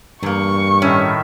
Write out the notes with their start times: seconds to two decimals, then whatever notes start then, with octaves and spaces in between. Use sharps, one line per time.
0.23 E2 G2 A#3 C#6
0.82 A2 D#3 C#4 E5